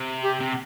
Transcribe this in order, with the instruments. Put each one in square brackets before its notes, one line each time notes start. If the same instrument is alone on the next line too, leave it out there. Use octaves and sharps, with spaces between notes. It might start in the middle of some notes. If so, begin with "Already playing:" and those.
Already playing: [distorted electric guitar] C3
[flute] G4
[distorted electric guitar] C3